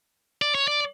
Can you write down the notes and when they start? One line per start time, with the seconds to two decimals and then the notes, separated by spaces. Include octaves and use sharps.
0.42 D5
0.55 C#5
0.68 D5